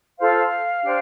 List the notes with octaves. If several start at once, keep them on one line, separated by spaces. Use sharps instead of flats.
F4 A4 C5 F5
D4 G4 C5